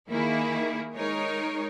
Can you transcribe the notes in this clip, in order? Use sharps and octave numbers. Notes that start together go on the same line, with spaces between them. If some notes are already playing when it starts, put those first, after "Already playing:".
D#3 A#3 E4 G#4
G#3 D#4 A#4 C#5